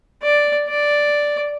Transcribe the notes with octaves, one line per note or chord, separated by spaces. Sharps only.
D5
D5